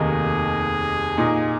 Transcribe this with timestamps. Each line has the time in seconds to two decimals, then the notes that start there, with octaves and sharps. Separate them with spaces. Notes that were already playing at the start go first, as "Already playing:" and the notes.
Already playing: F1 D#2 D#3 A#3 G#4
1.17 A#2 A#3 D#4